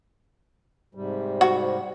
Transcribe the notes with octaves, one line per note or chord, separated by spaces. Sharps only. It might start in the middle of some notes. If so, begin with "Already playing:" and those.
G#2 C3 G3
F#4